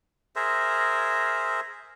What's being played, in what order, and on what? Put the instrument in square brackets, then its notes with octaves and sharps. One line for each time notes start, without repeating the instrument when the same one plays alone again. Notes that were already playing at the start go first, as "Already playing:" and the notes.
[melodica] G#4 A#4 C5 E5